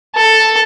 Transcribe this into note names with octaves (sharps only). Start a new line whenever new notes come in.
A4